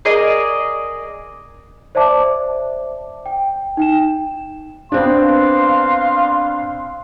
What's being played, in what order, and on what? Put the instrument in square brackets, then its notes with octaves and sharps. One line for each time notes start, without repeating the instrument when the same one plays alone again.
[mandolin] G#4 A#4 D5 D#5
[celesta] C5 D5 E5 A5 D6
G5
D#4 G5 E7
[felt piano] B3 C4 D4 [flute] F5 [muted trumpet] C6